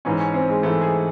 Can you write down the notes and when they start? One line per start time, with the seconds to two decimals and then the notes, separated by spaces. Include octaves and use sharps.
0.05 G#2 E3 C#4
0.20 C#4
0.34 C4
0.49 G#3
0.63 G#2 E3 A3
0.82 G#4